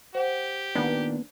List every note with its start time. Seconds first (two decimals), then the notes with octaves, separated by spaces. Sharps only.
0.15 G4 C5 F#5
0.75 A#2 D#3 B3 D4